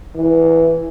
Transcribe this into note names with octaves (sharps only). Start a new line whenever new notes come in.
E3